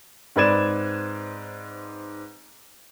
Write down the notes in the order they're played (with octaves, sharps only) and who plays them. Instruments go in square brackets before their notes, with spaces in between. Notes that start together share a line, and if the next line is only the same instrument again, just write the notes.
[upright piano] G#2 C4 B4 D5 G#6 E7